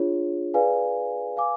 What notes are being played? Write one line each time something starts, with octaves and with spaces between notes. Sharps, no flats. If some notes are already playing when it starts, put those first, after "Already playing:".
Already playing: D4 F4 G#4 C#5
G#4 B4 D5 F5 G#5
B4 F5 G#5 D6